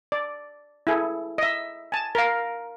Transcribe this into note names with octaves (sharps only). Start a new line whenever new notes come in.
D5
E4 G#4 A4
D#5 E5
G#5 A5
A#4 F5